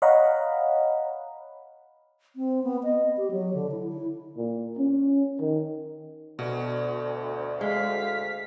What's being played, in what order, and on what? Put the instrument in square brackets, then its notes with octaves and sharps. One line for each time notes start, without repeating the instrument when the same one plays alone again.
[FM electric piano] C#5 D#5 F5 F#5 A#5 B5
[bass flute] C4
B3
D#5
G4
F#3
D3
E4
E4
[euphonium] A#2
C#4
D#3
[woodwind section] D2 [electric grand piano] B2 F#4
[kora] G#3 [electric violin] F5 B6